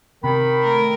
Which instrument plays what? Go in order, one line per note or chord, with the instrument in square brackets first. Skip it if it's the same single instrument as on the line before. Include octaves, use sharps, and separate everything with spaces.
[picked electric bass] C3 [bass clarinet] D#3 [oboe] B5
[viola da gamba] A3 A#4